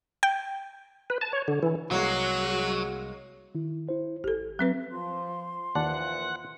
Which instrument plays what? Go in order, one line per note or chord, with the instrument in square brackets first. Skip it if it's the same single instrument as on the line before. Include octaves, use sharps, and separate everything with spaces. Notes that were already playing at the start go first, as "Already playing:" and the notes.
[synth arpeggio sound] G5
[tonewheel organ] B4
A5
C#5
D3
E3
[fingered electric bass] C2 [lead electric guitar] F#3 [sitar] G#3 A#3 C#5 [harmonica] F#4
[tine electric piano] D#3 E4
E4 C5
[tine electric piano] G#1 [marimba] G4 A4
[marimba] F#3 C4 B4
[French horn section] F3 [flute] C6
[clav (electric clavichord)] D#2 D5 A5 [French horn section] A#2 E3 F3 [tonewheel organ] F#5